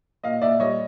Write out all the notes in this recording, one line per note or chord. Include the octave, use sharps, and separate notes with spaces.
A#2 D#5 F5
A#2 D5 E5
G3 C#5 D#5